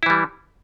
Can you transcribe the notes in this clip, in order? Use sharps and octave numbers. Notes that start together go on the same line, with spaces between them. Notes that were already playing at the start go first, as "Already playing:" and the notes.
E3 G3 E4